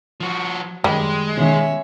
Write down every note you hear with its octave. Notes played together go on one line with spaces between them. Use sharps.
F3 F#4
F#2 D#3 G3 G#3
B2 D#3 C#4 E5